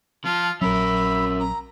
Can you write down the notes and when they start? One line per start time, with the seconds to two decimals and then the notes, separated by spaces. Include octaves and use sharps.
0.25 F3 F4 A5
0.61 A#1 F#3 C#4 A#4 E5 B5
1.39 A#5